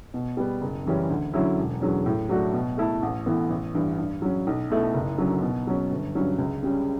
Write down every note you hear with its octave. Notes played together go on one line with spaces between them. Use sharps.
B2
G3 B3
F#1
F#2 E3 G3 C#4
D2
D3 F#3 C#4 E4
E1
E2 D3 F#3 C#4
A2
F#3 A3 D4 F#4
B2
A3 E4 A4
A1
A2 E3 B3
A1
G2 E3
G2
F#3 C#4
B1
B2 A3 E4
F#1
F#2 D3 F#3
B2
F#3 C#4
G1
G2 F#3 C#4
C#2
C#3 G3 C#4